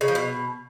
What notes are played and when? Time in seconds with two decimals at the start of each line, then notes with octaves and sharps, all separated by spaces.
0.01 C#3
0.08 F3
0.15 B2